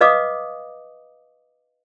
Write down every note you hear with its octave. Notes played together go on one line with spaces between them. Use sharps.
B4 D#5 F5 D6 D#6